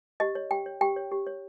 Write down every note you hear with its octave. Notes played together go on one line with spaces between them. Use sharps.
G4 D#5
C#5
G4 G5
C#5
G4 G5
C#5
G4
C#5